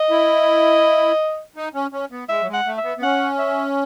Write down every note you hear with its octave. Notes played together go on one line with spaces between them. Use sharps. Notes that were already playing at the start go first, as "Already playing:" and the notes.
Already playing: D#5
E4
D#4
C#4
C#4
B3
G#3 E5
F#3
G#3
F#5
A3
E5
B3
B3
C#4 F#5
E5